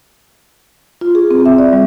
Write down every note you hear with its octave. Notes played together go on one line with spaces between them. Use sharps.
F4
G#4
C4
E5
D5
G3